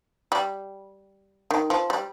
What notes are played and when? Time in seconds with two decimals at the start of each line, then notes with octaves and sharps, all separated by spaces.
0.32 G3
1.51 D#3
1.70 F3
1.90 G3